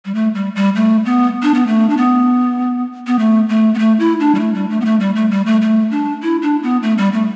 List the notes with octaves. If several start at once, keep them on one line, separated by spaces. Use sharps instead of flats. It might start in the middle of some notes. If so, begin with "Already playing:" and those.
G3
A3
G3
G3
A3
B3
D4
B3
A3
D4
B3
B3
A3
A3
B3
A3
E4
D4
G3
A3
G3
A3
B3
A3
G3
A3
G3
A3
A3
D4
E4
D4
B3
A3
G3
A3